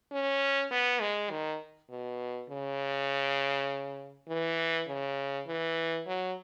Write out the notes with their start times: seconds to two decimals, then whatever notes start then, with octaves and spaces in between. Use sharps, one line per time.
0.12 C#4
0.71 B3
1.01 G#3
1.31 D#3
1.90 B2
2.50 C#3
4.28 E3
4.88 C#3
5.47 E3
6.07 F#3